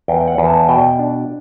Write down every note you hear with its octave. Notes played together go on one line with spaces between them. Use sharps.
E2 G5
G5
F#5
E2
A5
B2 G5
D4